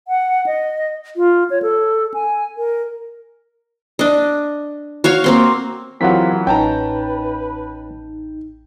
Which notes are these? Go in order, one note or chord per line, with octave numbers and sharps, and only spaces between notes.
F#5
D#5
F4
C#5
A4
G#5
A#4
D4 D#5
F#4 C#5 F5
A#3 C4 C6
E3 F#3 C4 F4 G4 A#4 F#5 B6
A1 C#4 D#4 B4 G5 A5 A#5